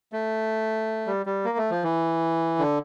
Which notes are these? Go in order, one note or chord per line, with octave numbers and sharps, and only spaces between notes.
A3
G3
G3
A#3
A3
F3
E3
D3